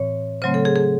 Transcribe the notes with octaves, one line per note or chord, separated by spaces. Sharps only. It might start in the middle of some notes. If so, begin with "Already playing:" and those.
Already playing: A2 E3 C4 C#5
C#3 F#3 A3 C4 C5
A4
G#4
G#4